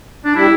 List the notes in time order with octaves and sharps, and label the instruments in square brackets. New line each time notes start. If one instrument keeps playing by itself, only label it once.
[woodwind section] D4
[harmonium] G3 [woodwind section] E4